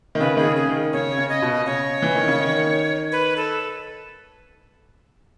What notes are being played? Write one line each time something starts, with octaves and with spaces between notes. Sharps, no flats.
D#3
C#3 B4
D#3 G#4
C#3
G#4
D#3
C#3 C#5
C#3
D#5
B2
C#3 C#5
E3
D#3
C#3
D#3
B4
A4